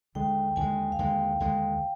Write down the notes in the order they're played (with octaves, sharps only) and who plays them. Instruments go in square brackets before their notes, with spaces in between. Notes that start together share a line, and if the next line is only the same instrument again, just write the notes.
[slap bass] D#2 D3 G#3 [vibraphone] G5
[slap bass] D#2 D3 G#3 [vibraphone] G#5
[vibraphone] F5
[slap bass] D#2 D3 G#3 [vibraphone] G5
[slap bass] D#2 D3 G#3 [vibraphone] G5